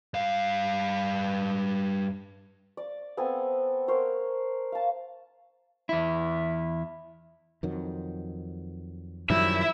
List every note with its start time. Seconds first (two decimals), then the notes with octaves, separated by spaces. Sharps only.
0.14 G2 F5
2.77 D5
3.17 B3 C4 A4 G#5
3.88 A#4 C5 C#5
4.72 F5 A5
5.89 E2 E4
7.63 F2 D#3 F#3
9.30 F#2 D#3 F3 G3 E4 E5